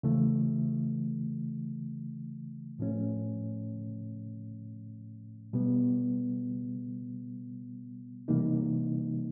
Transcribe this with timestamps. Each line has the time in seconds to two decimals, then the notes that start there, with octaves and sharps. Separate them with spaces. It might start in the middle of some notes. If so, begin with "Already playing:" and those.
0.03 C#3 E3 A3
2.79 A2 F3 A3 C#4
5.53 B2 G3 B3
8.28 C3 E3 G3 A#3 D#4